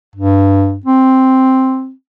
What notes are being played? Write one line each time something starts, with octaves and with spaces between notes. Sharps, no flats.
G2
C4